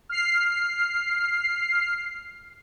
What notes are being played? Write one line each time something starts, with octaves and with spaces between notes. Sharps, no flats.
F6 C7